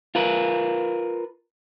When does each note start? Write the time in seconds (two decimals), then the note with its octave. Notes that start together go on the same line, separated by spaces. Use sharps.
0.15 F4 A#4 B4